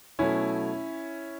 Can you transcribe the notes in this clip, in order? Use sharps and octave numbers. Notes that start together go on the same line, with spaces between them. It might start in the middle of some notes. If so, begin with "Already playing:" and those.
B2 F#3 A3 C#4 E4